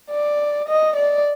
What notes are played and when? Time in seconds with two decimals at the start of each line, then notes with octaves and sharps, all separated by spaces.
0.11 D5
0.69 D#5
0.96 D5